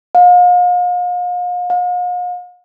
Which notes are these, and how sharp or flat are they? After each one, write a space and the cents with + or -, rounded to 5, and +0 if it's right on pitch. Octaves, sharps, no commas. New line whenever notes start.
F5 +40
F5 +45